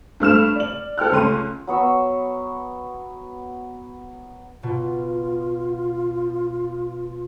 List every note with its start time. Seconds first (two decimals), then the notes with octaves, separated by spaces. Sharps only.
0.20 G2 A3 F6 E7
0.56 D5 F#7
0.98 A4 G5 F6 F#6
1.11 C#2 A3 C#4 C6 D#7
1.67 F#3 B3 C#6 E6
4.63 B2 F4